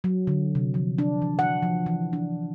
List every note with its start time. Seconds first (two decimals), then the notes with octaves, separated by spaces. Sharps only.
0.04 F#3
0.27 D3
0.55 C3
0.74 F3
0.98 D4
1.22 E3
1.39 F#5
1.63 F3
1.86 E3
2.13 D4